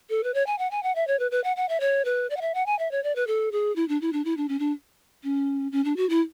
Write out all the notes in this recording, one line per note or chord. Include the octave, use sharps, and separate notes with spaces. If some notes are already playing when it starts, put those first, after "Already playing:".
A4
B4
C#5
G#5
F#5
G#5
F#5
E5
C#5
B4
B4
F#5
F#5
E5
C#5
B4
D5
F#5
E5
F#5
G#5
E5
C#5
D5
B4
A4
G#4
E4
D4
E4
D4
E4
D4
C#4
D4
C#4
C#4
D4
F#4
E4